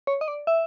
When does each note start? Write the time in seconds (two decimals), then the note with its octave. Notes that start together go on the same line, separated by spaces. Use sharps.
0.07 C#5
0.21 D#5
0.28 D5
0.47 E5